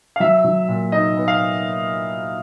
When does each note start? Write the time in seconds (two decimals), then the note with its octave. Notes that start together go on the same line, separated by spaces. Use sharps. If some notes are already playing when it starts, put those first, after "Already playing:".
0.16 F5
0.20 F#3 E5
0.45 F#3
0.69 A#2
0.92 D#4 D#5
1.17 B3
1.28 F5